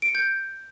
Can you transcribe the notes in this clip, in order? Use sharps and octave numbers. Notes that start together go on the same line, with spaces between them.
D7
C#7
G6